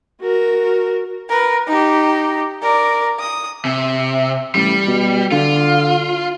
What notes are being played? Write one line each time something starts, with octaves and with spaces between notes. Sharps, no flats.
F#4 A#4
A#4 B4
D#4 G4
A#4 D5
D#6
C3
A1 G3
B2
D3 F4